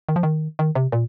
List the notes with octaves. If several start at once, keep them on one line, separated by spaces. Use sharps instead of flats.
D#3
F3
D#3
D#3
C3
A#2